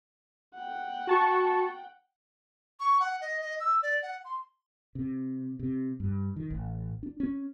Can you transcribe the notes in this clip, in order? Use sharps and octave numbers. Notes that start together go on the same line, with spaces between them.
F#5 G5
F#4 A5 C#6
C#6
F#5
D#5
D#5
E6
D5
F#5
C6
C3
C3
G2
D#3
A1
D4
C#4